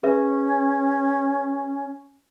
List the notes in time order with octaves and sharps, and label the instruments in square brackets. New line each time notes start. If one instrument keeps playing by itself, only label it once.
[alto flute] C#4 [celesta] G#4 B4 E5